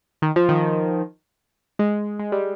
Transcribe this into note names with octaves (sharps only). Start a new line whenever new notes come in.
D#3
F3
D#3
G#3
G#3
G3